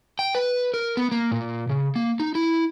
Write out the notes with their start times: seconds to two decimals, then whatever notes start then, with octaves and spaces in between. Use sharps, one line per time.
0.19 G5
0.35 B4
0.74 A#4
0.97 B3
1.12 A#3
1.31 A#2
1.70 C#3
1.96 A#3
2.20 D#4
2.35 E4